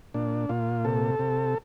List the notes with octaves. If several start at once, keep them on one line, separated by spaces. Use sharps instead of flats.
A#2 D4
A#2 F4
C3 A4
C3